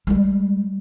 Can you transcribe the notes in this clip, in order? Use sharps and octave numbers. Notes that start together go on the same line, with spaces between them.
G3 G#3